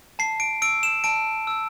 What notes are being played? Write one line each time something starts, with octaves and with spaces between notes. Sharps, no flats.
A5 C7
D7
E6 D7
E7
A5 D7
E6